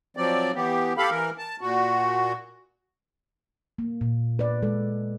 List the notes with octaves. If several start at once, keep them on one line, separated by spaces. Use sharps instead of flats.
F3 F#3 C4 D5
E3 B3 G4
G4 A4 F5 B5
E3 A#4
A5
A#2 F#4
A#3
A#2
B4 D5
G#3 A4